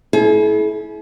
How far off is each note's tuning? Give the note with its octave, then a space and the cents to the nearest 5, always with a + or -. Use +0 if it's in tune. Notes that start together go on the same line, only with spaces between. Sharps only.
E4 -15 G#4 +45